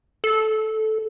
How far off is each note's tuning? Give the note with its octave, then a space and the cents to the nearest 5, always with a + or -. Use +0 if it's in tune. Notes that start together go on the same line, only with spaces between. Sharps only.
A4 -10